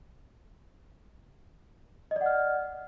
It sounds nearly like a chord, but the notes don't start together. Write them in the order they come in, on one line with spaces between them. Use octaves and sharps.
D#5 D5 F#5 F6